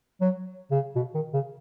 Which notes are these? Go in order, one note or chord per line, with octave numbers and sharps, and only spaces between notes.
F#3
C#3
B2
D#3
C#3